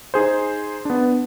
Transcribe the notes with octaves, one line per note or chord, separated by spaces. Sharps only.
D#4 G#4 C5
B3 D4